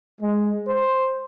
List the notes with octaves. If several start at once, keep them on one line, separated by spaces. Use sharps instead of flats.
G#3
C5